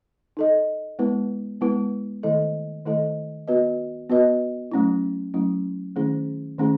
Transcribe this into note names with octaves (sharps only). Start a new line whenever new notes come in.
D#4 A4 D#5
G#3 B3 E4 B4
G#3 B3 E4 B4
D#3 A3 E4 A4 D#5
D#3 A3 E4 A4 D#5
B3 F#4 B4 D#5
B3 F#4 B4 D#5
F#3 A3 C#4 E4
F#3 A3 C#4 E4
D#3 A3 C#4 E4 G#4
D#3 A3 C#4 E4 G#4